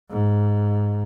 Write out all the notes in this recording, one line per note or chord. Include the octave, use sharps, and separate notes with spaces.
G#2